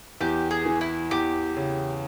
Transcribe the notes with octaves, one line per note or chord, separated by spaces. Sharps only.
E2 G4
G#4
E3
E4
E2 G4
C#3